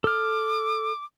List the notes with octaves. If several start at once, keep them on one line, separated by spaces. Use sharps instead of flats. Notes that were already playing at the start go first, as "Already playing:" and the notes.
A4 D6 F6